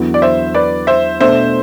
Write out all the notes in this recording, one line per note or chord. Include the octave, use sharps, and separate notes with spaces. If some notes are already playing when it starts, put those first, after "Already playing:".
Already playing: E2 D3 F#3 B3 E4
D5
C5 E5
B4 D5
C5 E5
B2 A3 D4 C5 E5